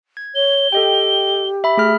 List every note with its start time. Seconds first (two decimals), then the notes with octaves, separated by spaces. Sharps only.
0.17 G#6
0.35 C#5 G7
0.72 G4 A4 D#5 G5
1.64 E5 B5
1.77 A3 G#4 F6